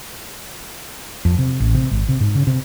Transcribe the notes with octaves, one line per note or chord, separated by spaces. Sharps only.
F2
C3
A1
C3
G#1
C3
G#2
C#3
C3